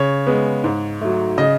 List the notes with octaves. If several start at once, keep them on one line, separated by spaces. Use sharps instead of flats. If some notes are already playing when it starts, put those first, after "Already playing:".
Already playing: C#3 C#5
G#3 B3
G#2
F#3 A3
C#3 D#5